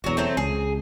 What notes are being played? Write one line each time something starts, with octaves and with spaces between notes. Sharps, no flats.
E1 E2 F#3 F#4
F#3 A3 C4
C#2 G#4